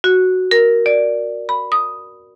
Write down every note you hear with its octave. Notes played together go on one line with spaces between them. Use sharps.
F#4
A#4
D5
B5
D#6